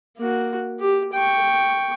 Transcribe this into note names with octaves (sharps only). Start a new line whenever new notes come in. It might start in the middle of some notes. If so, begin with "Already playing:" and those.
A#3 F#4
G4
G5 C#6